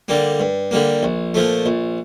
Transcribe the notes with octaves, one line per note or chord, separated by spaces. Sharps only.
D3 G3 A#3
G2
D3 G3 A#3
A#1
A#2 F3 A3
A#1